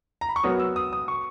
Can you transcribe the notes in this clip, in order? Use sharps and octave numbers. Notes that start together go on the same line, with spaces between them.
A#5
B5
C#6
F#3 B3 F#4 A#4 C#5 D#6
E6
D#6
D#6
C#6